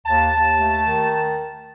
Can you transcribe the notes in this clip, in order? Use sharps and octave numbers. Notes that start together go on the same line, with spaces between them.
D#2 A5
D#2
A3
D#3